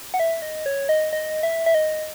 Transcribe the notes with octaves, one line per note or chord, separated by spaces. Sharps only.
F#5
E5
D#5
C#5
D#5
D#5
E5
E5
D#5